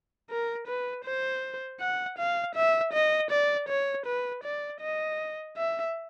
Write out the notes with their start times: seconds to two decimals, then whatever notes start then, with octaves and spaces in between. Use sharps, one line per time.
0.30 A#4
0.67 B4
1.05 C5
1.81 F#5
2.18 F5
2.55 E5
2.94 D#5
3.31 D5
3.69 C#5
4.06 B4
4.44 D5
4.81 D#5
5.57 E5